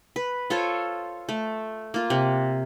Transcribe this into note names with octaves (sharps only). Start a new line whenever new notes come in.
B4
F4 A4 C5 C#5
A3
A#3 F4
C3